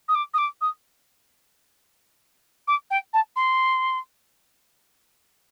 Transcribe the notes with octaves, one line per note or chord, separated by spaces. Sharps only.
D#6
D6
D#6
D6
D#6
D6
G5
A5
C6